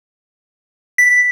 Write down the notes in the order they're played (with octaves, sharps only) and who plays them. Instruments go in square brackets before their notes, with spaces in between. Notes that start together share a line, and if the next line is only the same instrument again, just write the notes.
[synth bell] B6